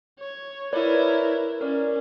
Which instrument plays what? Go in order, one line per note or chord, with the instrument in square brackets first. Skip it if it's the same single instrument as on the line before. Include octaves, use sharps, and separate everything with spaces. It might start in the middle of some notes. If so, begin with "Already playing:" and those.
[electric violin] C#5
[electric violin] E4 A#4 [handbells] B4 C#5 D5
[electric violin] C#4 [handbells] A#4 D5